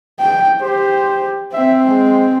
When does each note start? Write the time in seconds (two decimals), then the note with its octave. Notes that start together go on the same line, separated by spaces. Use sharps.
0.20 G5
0.62 G4 C5
1.53 C4 E5
1.87 G#3